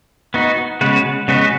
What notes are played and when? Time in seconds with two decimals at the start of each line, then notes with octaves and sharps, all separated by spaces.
0.34 B3 D#4 F#4
0.81 C#3 G#3 B3 F#4 B4
1.28 C#3 G#3 B3 F#4 B4